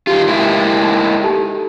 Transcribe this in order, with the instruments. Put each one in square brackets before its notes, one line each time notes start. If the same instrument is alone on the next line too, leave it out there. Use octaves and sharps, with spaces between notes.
[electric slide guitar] D#3 F4 [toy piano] G4
[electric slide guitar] G#3 A#3 E4
[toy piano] D#4
D#4 G4 A4